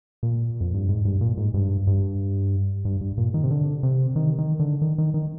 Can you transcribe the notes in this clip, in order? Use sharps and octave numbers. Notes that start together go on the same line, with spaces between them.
A#2
F2
G2
G#2
G2
A#2
G#2
G2
G2
G2
G2
A#2
D#3
C3
D3
C3
D#3
D#3
D3
D#3
D#3
D#3